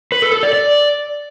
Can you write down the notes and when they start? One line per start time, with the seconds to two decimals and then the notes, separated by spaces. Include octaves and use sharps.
0.12 B4
0.22 A4
0.33 A4
0.43 D5
0.53 D5